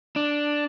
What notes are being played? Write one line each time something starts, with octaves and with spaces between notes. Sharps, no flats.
D4